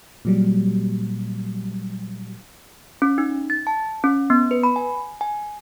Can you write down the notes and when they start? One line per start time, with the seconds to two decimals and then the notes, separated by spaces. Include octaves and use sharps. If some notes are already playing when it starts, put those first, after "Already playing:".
0.25 A#2 F#3 G3
3.02 C#4
3.18 D#4
3.50 A6
3.67 A5
4.04 C#4
4.30 B3
4.51 B4
4.63 B5
4.76 G#5
5.21 G#5